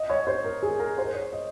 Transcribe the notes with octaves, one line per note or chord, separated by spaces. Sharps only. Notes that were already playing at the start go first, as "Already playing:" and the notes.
Already playing: D#5
C#5
C5
A#4
G#4
A#4
C5
C#5
D#5